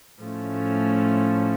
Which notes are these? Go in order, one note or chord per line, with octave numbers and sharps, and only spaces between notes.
A2 F3 A3 C#4